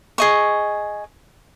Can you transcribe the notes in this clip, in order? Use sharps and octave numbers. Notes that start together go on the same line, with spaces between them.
G#4 D#5 C#6